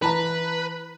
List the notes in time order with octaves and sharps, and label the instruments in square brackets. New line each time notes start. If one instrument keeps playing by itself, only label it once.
[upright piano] E3 A5 A#5 [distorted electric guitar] B4